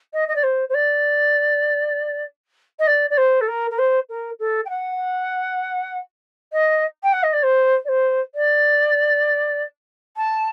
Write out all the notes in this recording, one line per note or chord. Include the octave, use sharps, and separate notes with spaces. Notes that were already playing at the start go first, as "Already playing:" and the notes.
D#5
D#5
D5
C5
C5
D5
D#5
D5
D5
C5
A4
A#4
A#4
C5
A#4
A4
G5
F#5
D#5
G5
F#5
D#5
D5
C5
D5
C5
D5
A5